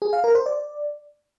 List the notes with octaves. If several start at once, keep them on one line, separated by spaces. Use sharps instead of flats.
G#4
F5
A#4
C5
D5